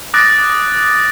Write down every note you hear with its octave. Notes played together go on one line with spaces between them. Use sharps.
D6 D#6 F#6 A6 A#6 D7